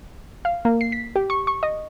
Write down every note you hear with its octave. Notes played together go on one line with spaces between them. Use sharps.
F5
A#3
C7
B6
G4
C#6
C#6
D#5